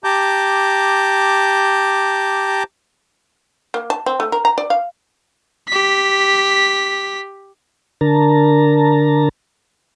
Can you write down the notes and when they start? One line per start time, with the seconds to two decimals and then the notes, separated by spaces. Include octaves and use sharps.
0.04 G4 A5 A#5 D6 G6
3.74 A#3
3.90 A5
4.06 C4
4.20 A3
4.32 A#4
4.45 A#5
4.58 D5
4.70 F5
5.68 G4 B6
8.01 D3 D4 A#4 A5 A#5